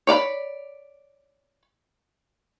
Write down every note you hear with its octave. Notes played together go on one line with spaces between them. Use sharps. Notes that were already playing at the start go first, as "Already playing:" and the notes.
C#5 D5 F5 B5